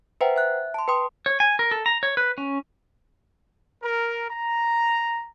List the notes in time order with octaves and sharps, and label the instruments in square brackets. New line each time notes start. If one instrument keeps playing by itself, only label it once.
[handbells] B4 C5 E5 F#5 G5 A#5
E5 F#6
A5 C6
B4 G5 C6 D#6
[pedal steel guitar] C#5
G#5
A#4
A4
A#5
C#5
B4
C#4
[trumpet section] A#4
A#5